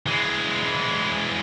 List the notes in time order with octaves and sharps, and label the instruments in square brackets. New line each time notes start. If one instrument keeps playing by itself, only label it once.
[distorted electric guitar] E3 G#3